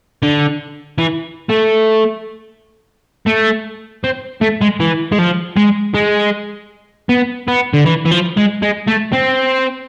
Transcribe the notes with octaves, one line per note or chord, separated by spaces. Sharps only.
D3
E3
A3
A3
C4
A3
G#3
E3
G#3
F3
G#3
G#3
B3
B3
D3
E3
E3
F3
G#3
G#3
A3
C4